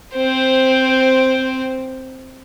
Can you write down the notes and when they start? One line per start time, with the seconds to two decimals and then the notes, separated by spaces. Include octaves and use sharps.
0.16 C4 C5